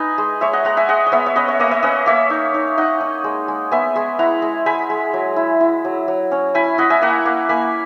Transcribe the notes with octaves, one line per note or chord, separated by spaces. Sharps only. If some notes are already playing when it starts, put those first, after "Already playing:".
Already playing: D#4 B4 D#5 G#5
G#3
G#3 C#5 E5
D#5 F#5
G#3 F#5 A#5
E5 G#5
G#3 D#5 F#5
D#5
B3 C#5 E5
C#5
C#4 B4 D#5
C#5 E5
A#3 B4 D#5
C#5 E5
C#4 B4 D#5
A#3 C#5 E5
D#4
D#4
D#4 D#5 F#5
D#4
G#3
G#3
B3 E5 G#5
G#3
E4 F#5 A#5
G#3
G#3 G#5 B5
G#3
F#3
E4
E4
F#3
F#3
C#4
E4 G#5 B5
E4 D#5 F#5
E5 G#5
A#3 F#5 A#5
A#3
A#3 G#5 B5